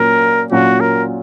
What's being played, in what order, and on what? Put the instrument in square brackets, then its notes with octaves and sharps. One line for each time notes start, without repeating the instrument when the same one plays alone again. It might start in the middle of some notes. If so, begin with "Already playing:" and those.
Already playing: [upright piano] A#2 F#3 C#4 F4 [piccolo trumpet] A#4
[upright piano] A#2 F#3 C#4 F4 [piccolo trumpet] F#4
[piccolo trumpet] A#4